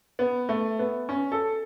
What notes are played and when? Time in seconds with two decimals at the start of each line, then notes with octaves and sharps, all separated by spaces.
0.19 B3
0.49 A3
0.79 B3
1.09 C#4
1.32 A4